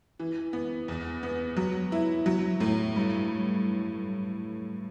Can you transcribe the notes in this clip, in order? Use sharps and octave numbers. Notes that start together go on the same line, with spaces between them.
E3
B3
E2
B3
F#3
E4
F#3
A2
G2